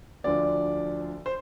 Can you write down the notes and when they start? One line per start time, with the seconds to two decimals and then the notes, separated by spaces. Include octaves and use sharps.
0.24 D2 D3 F3 D5
1.26 C5